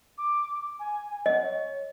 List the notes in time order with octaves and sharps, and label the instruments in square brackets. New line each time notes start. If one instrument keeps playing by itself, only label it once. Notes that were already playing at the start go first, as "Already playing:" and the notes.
[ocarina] D6
G#5
[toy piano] D#5 [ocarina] F#5
[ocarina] C#5